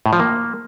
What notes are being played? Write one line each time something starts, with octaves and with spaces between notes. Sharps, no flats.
A2
F3
A#3